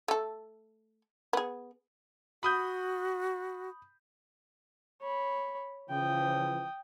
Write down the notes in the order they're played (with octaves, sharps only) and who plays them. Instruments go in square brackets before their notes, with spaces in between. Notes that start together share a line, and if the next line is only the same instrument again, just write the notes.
[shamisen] A3 A4
B3 G#4
[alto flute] F#4 [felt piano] B5 D#6 G6
[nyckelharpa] C#5 B5
[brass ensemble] C#3 E3 F3 [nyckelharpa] G5 D#6